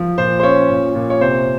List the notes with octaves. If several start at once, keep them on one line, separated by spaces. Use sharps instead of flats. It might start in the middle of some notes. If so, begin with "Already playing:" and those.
Already playing: F3
A#2 C5
C5
C#4 C#5
A#2
A#2
C#5
C3 C5